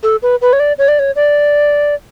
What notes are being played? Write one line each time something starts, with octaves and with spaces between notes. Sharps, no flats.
A4
B4
B4
C#5
D5
C#5
D5
C#5
D5